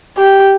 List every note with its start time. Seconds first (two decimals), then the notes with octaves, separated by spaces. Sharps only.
0.18 G4